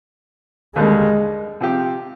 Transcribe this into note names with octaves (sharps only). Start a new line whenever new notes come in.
D#2 D3 G3 G#3 A#3
C3 F3 C4 G4